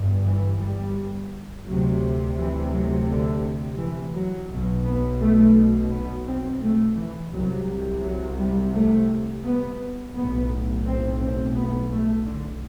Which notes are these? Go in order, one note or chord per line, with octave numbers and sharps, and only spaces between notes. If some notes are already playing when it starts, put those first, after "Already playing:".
Already playing: G1 G2
E3
G3
D2 C3 F#3
E3
F#3
D3
E3
F#3
B1 B2 F#3
B3
A3
B3
C4
A3
E3
C2 C3 F#3
F#3
G3
A3
B3
B1 A2 B3
C4
C4
B3
A3
D3